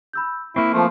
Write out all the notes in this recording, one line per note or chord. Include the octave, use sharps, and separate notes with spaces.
B5 E6 G6
A#3 C4 E4 C#6
F3 A3 C6